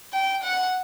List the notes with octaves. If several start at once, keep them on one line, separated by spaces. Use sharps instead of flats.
G5
F#5